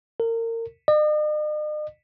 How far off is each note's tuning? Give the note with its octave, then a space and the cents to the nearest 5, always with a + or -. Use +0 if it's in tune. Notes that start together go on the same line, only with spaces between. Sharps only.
A#4 -30
D#5 -45